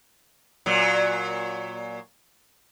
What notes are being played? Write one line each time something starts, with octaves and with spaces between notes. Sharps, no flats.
A#2 F#3